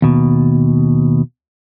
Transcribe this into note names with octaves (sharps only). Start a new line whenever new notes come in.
D#2 B2